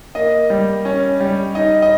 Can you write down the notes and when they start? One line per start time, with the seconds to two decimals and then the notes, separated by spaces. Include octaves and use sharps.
0.15 A#3 D#5
0.50 G3
0.85 C#4
1.20 G3
1.55 D#4 D#5
1.82 D#5